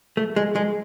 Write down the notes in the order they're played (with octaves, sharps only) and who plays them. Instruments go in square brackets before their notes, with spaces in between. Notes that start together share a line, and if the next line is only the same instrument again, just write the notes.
[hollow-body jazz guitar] A3
G#3
G#3